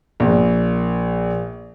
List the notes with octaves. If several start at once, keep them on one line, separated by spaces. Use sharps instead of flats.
A#1 A#2